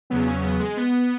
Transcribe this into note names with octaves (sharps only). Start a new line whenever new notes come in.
E2 C#3 F#3 B3
C#4
B3
G#3
B3